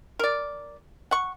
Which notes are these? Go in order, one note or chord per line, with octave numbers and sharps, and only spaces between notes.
A#4 D5
F#5 C#6